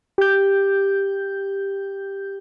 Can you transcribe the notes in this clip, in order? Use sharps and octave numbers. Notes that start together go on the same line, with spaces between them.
G4 G6